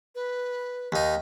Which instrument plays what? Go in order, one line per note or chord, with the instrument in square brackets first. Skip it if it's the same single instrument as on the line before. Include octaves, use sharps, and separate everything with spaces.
[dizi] B4
[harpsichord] D#2 D#4